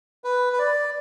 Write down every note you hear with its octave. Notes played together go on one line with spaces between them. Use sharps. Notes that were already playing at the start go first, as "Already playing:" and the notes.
B4
B4
D5